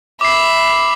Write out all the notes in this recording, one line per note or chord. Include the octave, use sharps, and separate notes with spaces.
E5 B5 D6 C7